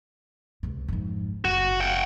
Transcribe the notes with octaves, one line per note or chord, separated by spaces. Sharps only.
C#2 C3
F2 G#2
F#1 F#4
F#5 G5